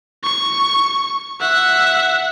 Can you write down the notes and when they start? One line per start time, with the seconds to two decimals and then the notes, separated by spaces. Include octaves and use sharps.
0.23 C#6
1.40 E5 F#5